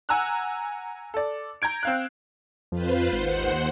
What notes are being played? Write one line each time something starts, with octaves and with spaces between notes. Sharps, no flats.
F#5 G#5 A#5 E6 F#6
A4 D5
A#5 G6 G#6 D7
C4 F5 F#6
F2 F4 B4 C5
G#1 D#2 C5 F#5